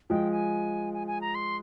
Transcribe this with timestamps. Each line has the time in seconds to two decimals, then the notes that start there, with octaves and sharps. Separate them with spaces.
0.10 F3 G#3 G5
0.31 G#5
0.94 G#5
1.07 G#5
1.21 A#5
1.35 C6